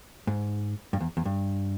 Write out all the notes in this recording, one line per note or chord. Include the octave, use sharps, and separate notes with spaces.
G#2
G2
E2
E2
G2